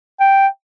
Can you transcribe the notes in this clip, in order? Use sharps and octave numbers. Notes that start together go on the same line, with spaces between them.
G5